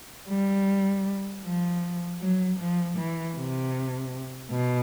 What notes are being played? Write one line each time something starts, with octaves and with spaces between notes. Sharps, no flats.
G3
F3
F#3
F3
E3
C3
B2